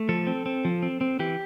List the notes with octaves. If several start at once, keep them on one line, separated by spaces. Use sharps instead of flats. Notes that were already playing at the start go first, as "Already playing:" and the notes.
Already playing: A3
F3 A4
C4
C4
F3
C4
C4
E3 G4